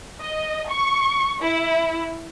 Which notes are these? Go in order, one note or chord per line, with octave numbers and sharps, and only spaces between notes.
D#5
C#6
E4